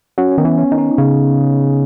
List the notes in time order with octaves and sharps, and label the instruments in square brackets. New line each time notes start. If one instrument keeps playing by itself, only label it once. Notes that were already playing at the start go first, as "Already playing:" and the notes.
[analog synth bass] F#3 [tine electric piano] C#4
[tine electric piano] C#4
[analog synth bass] D#3 [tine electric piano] B3
[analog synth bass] E3
[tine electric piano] C#4
[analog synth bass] D#3
[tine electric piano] D#4
[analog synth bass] C#3